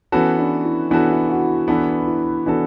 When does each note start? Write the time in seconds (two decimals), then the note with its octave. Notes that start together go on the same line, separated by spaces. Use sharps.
0.12 E3 B3 C#4 F#4 A4
0.39 D4
0.65 E4
0.91 E3 B3 D4 F#4 A4
1.10 E4
1.29 F#4
1.68 E3 B3 D4 F#4 A4
2.07 E4
2.46 E3 B3 D4 F#4 A4